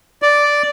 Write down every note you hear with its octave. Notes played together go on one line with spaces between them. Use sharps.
D5